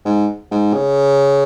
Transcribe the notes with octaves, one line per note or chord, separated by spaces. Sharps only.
G#2
G#2
C#3